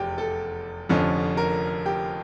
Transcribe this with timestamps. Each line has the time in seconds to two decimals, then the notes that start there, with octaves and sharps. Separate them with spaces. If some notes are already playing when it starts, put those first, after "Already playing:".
Already playing: F1 E2 G4
0.18 A4
0.89 F1 F2 D3 F3 C#4
1.37 A#4
1.86 G4